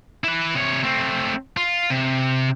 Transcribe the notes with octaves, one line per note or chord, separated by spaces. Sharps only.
E4 B4
C3 C#5
A3 C4
F4
C3